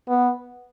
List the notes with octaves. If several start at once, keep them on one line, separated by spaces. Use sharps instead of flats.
B3